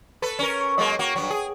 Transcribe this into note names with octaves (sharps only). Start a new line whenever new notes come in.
A4 B4
C#4 A#4
F#3 G#3 A#3
A#3 F#4
G2 E3 F#3
G#4